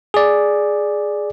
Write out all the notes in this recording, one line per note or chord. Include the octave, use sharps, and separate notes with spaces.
G#4 D5